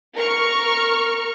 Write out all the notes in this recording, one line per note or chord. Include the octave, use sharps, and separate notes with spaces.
A#4 C#6 F6